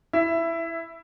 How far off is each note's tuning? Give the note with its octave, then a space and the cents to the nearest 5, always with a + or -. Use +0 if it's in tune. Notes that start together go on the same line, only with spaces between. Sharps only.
E4 +0 E5 +15